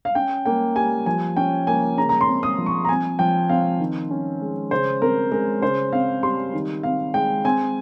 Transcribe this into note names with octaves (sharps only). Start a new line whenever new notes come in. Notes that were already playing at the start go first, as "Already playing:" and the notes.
F5
C#4 G5
A#3 G5
G3 G#5
F3 G#5
C#4 G5
A#3 G#5
C#3 A#5
A#5
C6
C4
D#6
F3
C#6
A#5
C4 G#5
F3 G5
C4 F5
D#3
C#4
G#3
C#3 C5
C4 A#4
G#3 A#4
C#3 C5
C4 F5
G3 C6
D#3
C4 F5
G#3 G5
C4 G#5